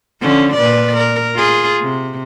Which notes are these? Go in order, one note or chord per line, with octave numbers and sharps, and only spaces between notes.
D3 F3 C#4
A#2 B4 D5
A#4
F4 G#4
C3